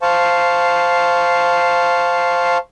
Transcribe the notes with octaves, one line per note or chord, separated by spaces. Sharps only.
C5 F5 A5 C#6